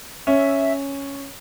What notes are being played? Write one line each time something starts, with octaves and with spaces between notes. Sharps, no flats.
C#4 E5